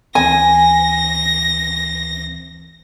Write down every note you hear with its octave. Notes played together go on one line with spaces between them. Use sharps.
D2 E3 C4 G#5 A#6